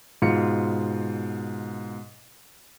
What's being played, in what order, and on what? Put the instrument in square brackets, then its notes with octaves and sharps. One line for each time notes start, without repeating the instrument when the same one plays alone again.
[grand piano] G#2 B2 F4 C#7